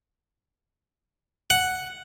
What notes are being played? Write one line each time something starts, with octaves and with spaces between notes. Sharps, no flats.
F#5